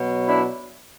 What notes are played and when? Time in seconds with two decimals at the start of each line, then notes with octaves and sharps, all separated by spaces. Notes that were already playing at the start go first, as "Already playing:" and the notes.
Already playing: B2 F#3
0.27 D4 E4